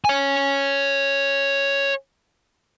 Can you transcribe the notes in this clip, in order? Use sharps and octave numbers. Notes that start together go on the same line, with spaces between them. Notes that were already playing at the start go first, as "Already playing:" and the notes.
C#5 G#5